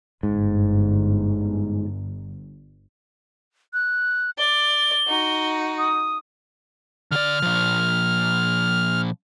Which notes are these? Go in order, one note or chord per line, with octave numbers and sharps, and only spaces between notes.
G1 G#2
F#6
D5 G7
D#4 F#4
D#6
D3 D5 F6
A#2 F3